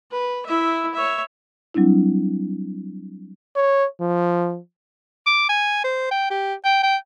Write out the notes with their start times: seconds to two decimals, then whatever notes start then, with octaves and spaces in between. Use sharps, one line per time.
0.11 B4
0.46 E4 E5
0.94 C#5 E5
1.74 F#3 G3 C4 D4 E4
3.56 C#5
4.01 F3
5.27 D6
5.49 G#5
5.84 C5
6.11 G5
6.30 G4
6.65 G5
6.83 G5